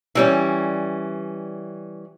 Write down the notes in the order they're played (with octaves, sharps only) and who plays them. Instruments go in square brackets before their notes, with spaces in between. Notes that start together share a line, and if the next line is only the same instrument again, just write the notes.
[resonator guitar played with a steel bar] E3 G3 C#4